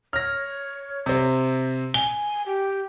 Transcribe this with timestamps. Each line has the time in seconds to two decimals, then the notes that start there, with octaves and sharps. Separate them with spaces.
0.13 C#5 F6 A#6
1.06 C3 C4
1.94 G#5 G7
2.46 G4